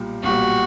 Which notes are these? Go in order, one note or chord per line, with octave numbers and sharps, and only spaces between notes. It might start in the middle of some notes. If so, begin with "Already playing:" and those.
Already playing: B1 A#2 G3
B1 A#2 G3 F#4